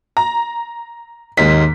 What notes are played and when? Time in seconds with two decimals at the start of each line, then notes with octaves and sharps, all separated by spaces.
0.17 A#5
1.38 D#2 G#2 A#3 B6